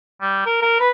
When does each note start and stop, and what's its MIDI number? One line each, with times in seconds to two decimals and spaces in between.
0.21 0.44 55
0.46 0.60 70
0.62 0.80 70
0.80 0.90 71